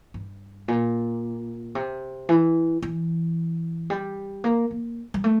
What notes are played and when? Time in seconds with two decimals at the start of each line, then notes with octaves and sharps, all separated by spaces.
0.14 G2
0.68 A#2
1.75 C3
2.29 E3
2.82 E3
3.90 G3
4.44 A#3
4.71 A#3
5.14 G3
5.24 A3